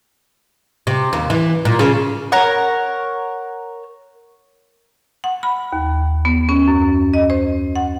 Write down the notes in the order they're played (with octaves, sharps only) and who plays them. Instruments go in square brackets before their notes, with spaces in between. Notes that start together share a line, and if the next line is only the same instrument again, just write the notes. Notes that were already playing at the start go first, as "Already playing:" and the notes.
[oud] C3
D#2
E3
A#2
C#3
[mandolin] A#4 C#5 F#5
[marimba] F#5
B5
D#2
B3
C#4
F#2
D#5
C5
F#5